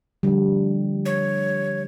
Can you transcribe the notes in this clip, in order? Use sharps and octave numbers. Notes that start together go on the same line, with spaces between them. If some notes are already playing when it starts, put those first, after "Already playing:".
D3 F3 G3
C#5